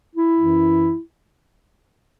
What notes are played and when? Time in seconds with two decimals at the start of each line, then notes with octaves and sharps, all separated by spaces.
0.13 E4
0.36 F#2 E3